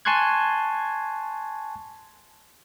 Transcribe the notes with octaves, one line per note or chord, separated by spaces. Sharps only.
G#5 A5 C6 C#6 F#6 G#6